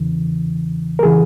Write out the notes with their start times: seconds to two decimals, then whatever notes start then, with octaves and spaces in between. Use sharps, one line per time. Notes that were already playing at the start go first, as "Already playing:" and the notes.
Already playing: E2 C#3 E3
0.99 A#4
1.03 C#3 E3 G#4